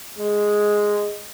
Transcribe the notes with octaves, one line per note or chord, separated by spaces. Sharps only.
G#3